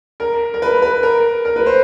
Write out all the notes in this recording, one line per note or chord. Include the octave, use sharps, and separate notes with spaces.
A#4
A#4
B4
B4
A#4
A#4
B4
C5